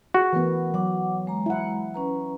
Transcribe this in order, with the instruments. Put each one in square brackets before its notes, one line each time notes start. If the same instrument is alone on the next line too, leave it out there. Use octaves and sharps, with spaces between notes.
[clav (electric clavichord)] F#4 [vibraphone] G#4
[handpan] E3 B3 [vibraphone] A3 A#4
[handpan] F#3 [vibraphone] F#5 D6
[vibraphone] G#3 A#5
[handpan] E4 F#5
[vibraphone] C#4 B4 A#5